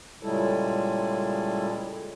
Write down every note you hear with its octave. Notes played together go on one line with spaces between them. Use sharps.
A#2 C#3 G3 G#3 E4 A4